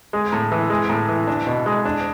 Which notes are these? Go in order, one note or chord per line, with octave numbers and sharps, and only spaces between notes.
G#3
A2
E3
G#3
A2
E3
D4
B2
G#3
D4